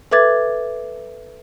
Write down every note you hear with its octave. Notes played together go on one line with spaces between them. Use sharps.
A4 B4 E5 D6 G#6 A6